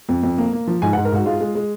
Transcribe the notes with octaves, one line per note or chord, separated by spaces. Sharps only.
F2
F2
A#3
A#3
F3
G#2 G#5
F#5
G#2
A#4
G#2 F#4
G#3 F4
G#3
G#3